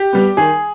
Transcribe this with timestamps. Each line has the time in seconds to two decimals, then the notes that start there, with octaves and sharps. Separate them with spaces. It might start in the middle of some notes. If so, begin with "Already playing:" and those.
Already playing: G4
0.13 G3 B3
0.37 D#3 G#4